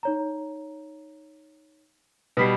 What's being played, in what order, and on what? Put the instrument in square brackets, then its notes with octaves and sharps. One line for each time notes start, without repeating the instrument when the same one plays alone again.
[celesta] D#4 C#5 A#5
[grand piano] B2 G3 [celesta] B4 B6 C7